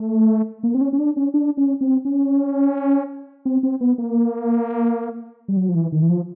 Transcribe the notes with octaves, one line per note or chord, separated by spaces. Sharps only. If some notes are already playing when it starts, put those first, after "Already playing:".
Already playing: A3
A#3
C4
C#4
C#4
D4
C#4
D4
C#4
C4
C#4
C4
C4
B3
A#3
G3
F#3
F3
E3
D#3
E3
F3